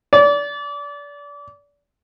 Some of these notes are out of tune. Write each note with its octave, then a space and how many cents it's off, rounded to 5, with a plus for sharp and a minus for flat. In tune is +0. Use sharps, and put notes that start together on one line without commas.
D5 -30